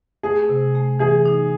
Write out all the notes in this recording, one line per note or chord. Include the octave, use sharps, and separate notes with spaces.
A3 G#4
C3
A3
E3 G#4
D#4